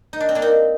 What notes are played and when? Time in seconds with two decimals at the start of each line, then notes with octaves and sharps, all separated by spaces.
0.13 D#4
0.20 D4
0.29 C4
0.35 A#3 D4
0.42 C4 D#4